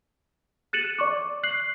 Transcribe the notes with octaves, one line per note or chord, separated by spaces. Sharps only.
F#6 A6 C#7 D#7 E7 F#7
D5 C#6 D6
F#6 C7 F#7